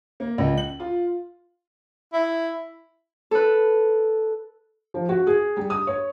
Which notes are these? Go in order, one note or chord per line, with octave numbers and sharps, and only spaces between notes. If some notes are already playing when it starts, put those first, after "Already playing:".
A#3
C#2
F#7
F4
E4
A4 B4
F3
F#4
G#4
G3
D#6
C#5